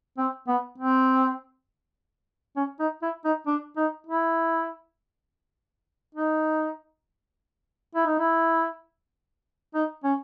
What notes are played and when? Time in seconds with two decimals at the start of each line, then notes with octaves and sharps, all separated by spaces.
0.18 C4
0.48 B3
0.78 C4
2.56 C#4
2.80 D#4
3.02 E4
3.25 D#4
3.47 D4
3.77 D#4
4.07 E4
6.15 D#4
7.95 E4
8.06 D#4
8.19 E4
9.74 D#4
10.04 C#4